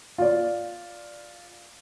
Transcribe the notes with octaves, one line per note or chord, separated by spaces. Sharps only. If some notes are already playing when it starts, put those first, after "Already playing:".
F4 D5